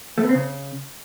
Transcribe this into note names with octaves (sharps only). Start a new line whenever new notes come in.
A3
B3
C4
C#3